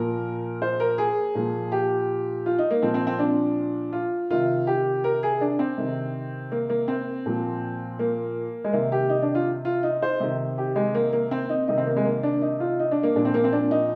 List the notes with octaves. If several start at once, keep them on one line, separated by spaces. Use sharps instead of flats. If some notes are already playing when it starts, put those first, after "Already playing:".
Already playing: A#2 F3 A#4
C5
A#4
G#4
A#2 F3
G4
F4
D#4
A#3
A#2 F3 C4
C4
C4
D4
F4
C3 D#3 F4
G4
A#4
G#4
D4
C4
C3 D#3
A#3
A#3
C4
A#2 F3
A#3
G#3
C3 D#3 A#3
G4
D#4
D4
F4
F4
D#4
C5
C3 D#3
G4
G#3
A#3
A#3
C4
D#4
C3 D#3 D#4
C4
A#3
G#3
A#3
D4
D#4
F4
D#4
D4
A#3
A#2 F3 D4
C4
A#3
C4
D4
D#4